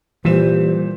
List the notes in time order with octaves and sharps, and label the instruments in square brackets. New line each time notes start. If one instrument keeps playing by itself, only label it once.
[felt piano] A#2 E7 [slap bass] E3 [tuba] G3 [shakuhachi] C5